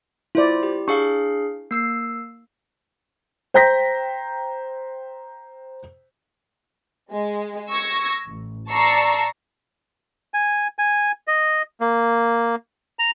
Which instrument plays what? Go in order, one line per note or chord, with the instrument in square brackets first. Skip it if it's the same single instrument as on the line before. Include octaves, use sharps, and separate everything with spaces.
[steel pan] E4 D5 [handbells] F4 C5
[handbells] G4
[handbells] D4 G#4 F5 [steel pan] C#6
[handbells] A#3 E6 C7
[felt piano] C5 G5 A#5 G6 A#6 B6
[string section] G#3
C#6 E6 G#6 A#6
A1
D5 A5 A#5 C#6 E6 C7
[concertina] G#5
G#5
D#5
A#3
A#5